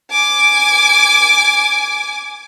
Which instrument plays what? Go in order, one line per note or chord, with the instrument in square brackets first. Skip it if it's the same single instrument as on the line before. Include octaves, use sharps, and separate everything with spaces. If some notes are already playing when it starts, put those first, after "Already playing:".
[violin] G#5 D6